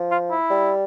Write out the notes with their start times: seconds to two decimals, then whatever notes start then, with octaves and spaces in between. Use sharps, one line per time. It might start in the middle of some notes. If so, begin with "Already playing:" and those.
Already playing: F3
0.11 F4
0.31 E4
0.50 G3